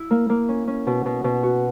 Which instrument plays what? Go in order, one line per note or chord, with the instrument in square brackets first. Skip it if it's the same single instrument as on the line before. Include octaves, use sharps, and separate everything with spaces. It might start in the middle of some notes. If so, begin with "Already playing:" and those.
Already playing: [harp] E4
A#3
A#3
C#4
C#4
B2
B2
B2
F#4